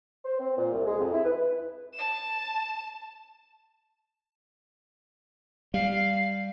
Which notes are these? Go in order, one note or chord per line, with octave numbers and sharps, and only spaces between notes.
C5
C4
A#2
C2
G#3
F2
E4
B4
A5 E7
G3 F5